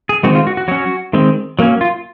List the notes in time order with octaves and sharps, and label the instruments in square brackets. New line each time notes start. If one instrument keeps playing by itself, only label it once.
[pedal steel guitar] G#4
D#3 G#3 C4 F#4
F4
F#4
F#4
F#3 C#4 F#4
D#3 G#3 C4
F#3 A#3 C#4
F4